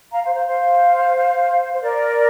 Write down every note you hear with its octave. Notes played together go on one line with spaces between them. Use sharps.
F5 A#5
C5 F5
C5 F5
C5 F5
C5
A#4 D5